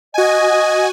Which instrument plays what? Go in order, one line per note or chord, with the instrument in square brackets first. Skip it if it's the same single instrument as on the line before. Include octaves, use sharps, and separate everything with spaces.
[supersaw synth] F#4 G#5 [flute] D#5